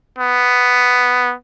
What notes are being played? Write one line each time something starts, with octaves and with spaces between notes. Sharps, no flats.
B3